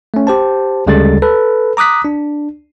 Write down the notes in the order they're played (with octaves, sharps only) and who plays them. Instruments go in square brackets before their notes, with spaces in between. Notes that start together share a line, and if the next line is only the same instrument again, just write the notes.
[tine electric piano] A3 C#4
G4 C5 A5
D2 C#3 G3 G#3 A4 A6
A4 B4
A#5 D6 D#6 F#6 B6
D4